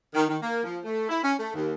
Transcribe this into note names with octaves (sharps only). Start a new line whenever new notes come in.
D#3
D#3
A#3
F3
A3
E4
C#4
A3
D#2